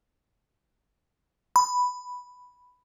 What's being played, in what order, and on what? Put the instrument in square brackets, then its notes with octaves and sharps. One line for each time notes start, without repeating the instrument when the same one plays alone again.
[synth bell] B5